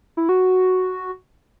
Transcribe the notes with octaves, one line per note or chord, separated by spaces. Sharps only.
E4
F#4